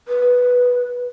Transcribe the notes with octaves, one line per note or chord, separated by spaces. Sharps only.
B4